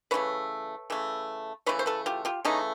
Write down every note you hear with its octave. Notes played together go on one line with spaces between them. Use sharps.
C#3 E3 A3 B4 C#5
C#3 E3 A3
C#3 E3 A3 B4 C#5
C5
A4 B4
F4 G4
F4 G4
C#3 E3 A3 C#4 D#4